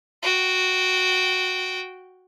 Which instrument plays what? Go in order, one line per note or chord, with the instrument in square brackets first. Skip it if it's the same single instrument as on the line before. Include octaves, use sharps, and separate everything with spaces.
[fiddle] F#4 G5